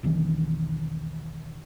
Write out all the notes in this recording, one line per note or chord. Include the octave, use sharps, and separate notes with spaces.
E1 B1 D#3 E3